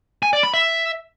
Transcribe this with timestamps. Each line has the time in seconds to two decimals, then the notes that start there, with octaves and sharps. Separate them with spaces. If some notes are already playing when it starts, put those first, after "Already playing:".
0.23 G#5
0.33 D5
0.43 B5
0.54 E5